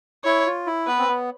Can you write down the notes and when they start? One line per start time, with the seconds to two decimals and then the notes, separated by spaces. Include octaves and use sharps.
0.24 E4 C#5
0.46 F4
0.67 E4
0.87 B3 B4
0.99 C4
1.08 B3